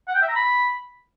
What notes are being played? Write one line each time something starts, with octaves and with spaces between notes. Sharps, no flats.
F#5
G5
E5
A#5
B5